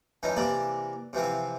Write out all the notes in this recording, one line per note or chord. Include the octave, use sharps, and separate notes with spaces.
E3 F3 C#4 D#4
C3 E3 A#3 D5
C3 E3 F3 C4